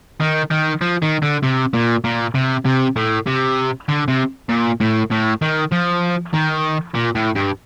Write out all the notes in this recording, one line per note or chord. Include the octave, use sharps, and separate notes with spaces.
D#3
D#3
F3
D#3
D3
C3
A#2
A#2
C3
C3
A2
C3
D3
C3
A#2
A2
A2
D#3
F3
D#3
A#2
A2
G2